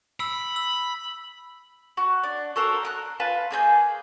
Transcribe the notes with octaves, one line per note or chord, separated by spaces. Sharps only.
B5 E6
E6
F#4
D4
F#4 A4 A#4 C5
A#5 D6 F#6
F4 B4 A5
A#3 G#4 A5 G6